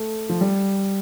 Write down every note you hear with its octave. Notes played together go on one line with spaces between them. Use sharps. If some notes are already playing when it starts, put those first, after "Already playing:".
Already playing: A3
F3
G3